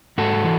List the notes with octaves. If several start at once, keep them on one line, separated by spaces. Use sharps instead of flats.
G#2 F#4 A4
E3